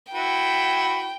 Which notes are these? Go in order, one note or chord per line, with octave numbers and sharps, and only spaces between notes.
E4 F#4 B4 G5